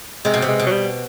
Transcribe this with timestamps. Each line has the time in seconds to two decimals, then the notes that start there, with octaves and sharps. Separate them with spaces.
0.25 C3 G#3
0.34 B2
0.42 C3
0.48 G#3
0.59 B2
0.66 F#3
0.71 G3